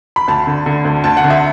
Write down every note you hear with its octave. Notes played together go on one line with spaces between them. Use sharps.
B5
D2 A5
D3
D3
D2
D2 A5
F#5
D3
E5